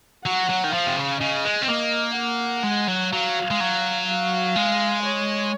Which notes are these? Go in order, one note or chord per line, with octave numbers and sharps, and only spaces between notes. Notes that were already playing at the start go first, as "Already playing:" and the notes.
F#3 F#5
F#3
D#3
F3 F5
C3
C#3
C#3 D#5
G#3
C4
A#3 D#5
F#5
G#3
F#3
F#3 F5
G#3
F#3
F5
G#3
C#5